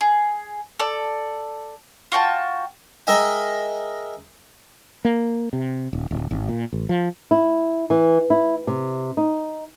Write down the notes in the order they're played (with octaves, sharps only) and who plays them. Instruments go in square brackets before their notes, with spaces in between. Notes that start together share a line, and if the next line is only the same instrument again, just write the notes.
[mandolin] G#4
A4 D5
F4 F#4 G5 A5
[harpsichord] G#3 A#4 D#5 E5 G5 G#5
[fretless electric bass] A#3
C3
D#1
D1
G#1
A#2
A1
F3
[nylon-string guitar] E4
E3
E4
C3
D#4